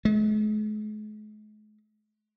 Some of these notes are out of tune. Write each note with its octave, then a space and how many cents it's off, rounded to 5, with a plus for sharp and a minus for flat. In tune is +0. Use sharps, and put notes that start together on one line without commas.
G#3 +45